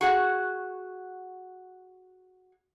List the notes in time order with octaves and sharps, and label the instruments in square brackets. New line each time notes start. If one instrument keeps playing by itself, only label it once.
[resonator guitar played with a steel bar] F#4 G#4 F#5